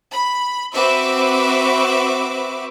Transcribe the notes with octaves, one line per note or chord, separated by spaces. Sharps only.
B5
C4 F#4 B4 E5 D6